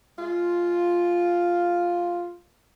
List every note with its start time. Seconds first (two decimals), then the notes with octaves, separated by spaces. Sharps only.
0.18 G#3 F4